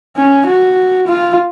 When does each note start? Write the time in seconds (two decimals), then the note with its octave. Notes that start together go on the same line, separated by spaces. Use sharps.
0.16 C#4
0.46 F#4
1.07 F4